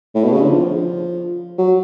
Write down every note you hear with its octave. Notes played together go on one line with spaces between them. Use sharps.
A2
B2
C#3
D3
F3
F#3